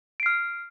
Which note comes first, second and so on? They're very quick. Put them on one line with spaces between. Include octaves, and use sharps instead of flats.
D7 C7 F6